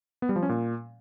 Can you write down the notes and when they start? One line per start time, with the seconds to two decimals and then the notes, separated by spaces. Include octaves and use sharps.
0.22 B3
0.29 G3
0.36 F3
0.43 C#4
0.49 A#2